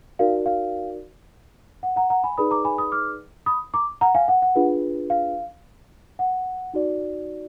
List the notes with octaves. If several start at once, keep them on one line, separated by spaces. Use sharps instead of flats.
D#4 F#4 A#4 D5 F5
F5
F#5
F#5 A#5
F#5 A#5
G#5 B5
D#4 G#4 B4 D5 B5 D#6
A#5 D6
G#5 B5
B5 D#6
D6 F6
B5 D#6
A#5 D6
F#5 A#5
F5 G#5
F#5
F#5
D4 F4 G#4 B4
F5
F#5
D#4 F#4 D5